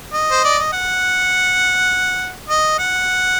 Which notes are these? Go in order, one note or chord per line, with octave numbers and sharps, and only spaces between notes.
D#5
C5
D5
D#5
F#5
D#5
F#5